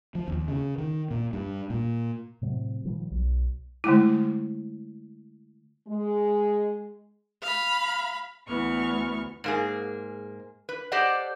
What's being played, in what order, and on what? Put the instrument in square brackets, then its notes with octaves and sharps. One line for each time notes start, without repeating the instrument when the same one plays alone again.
[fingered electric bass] F3
D#2
C#3
D#3
A#2
G2
A#2
A2 C3 F#3
A#2 D#3 F3 G3
B1
[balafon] D3 G#3 A3 E4
[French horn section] G#3
[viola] F5 B5
[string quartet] D2 E3 B3 C#6 F6
[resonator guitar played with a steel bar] G#2 A#3 G#4
B4
G4 A4 C5 D5 D#5 F#5